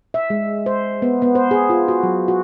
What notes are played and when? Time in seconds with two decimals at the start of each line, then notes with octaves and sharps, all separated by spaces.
0.14 E5
0.30 G#3
0.66 C5
1.02 B3
1.22 B3
1.35 C5
1.51 G#4
1.70 F4
1.88 F#4
2.03 F#3
2.28 F#4